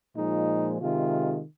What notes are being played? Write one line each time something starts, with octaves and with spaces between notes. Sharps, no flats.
A#2 F3 G#3 D#4
C3 D#3 G#3 F4